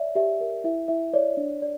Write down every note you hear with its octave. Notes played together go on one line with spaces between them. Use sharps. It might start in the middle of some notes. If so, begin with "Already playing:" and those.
Already playing: C#5 D5 E5
G4 E5
A#4
E4 E5
E4 E5
C#5 D5
D4
D5